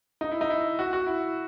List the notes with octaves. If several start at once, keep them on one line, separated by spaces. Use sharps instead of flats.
D#4
E4
D#4
E4
F#4
F#4
E4